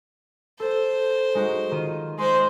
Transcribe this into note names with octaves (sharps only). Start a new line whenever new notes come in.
A4 C5
G#3 D#4 F#4
D#3 F4 D#7
G#3 C5 C6